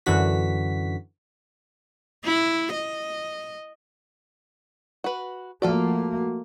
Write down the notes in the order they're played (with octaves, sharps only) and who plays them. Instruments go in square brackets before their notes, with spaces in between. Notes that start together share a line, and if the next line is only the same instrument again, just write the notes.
[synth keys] F#2 D3 E3 D4 F#4 B6
[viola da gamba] E4
D#5
[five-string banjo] F#4 B4
[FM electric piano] F3 F#4 [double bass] A3 A#3 [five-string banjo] F4 A4 D5